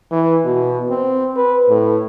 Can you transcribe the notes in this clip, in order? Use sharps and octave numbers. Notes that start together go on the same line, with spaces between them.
E3
B2
C4
B4
A2